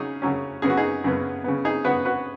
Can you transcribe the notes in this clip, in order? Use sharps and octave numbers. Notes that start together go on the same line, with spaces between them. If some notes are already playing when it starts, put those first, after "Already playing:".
Already playing: C#3 F#3 C#4 D#4 G#4
C#3 F#3 C#4
F#2 C#3 B3 G#4
F#4
D#4 G#4
F#2 C#3 B3
C#3 B3
D#4 G#4
C#3 B3 F#4 B4
F#4 B4